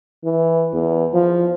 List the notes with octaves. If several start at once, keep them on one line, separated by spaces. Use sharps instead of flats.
E3
E2
F3